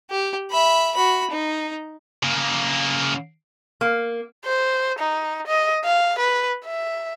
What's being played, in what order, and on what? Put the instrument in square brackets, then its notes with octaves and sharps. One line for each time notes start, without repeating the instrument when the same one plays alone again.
[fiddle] G4
E5 B5
F#4 B5
D#4
[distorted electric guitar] C#3 A#3
[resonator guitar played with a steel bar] A#3
[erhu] C5
D#4
D#5
F5
B4
E5